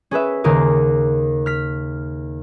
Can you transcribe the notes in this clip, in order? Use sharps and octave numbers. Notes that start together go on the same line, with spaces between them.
C#4 G#4 B4 E5
D#2 C#3 G#4 A#4 D6
F6 B6